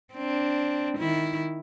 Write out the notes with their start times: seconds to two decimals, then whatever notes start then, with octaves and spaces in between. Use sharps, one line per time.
0.14 C4 D4
0.98 D#3 E4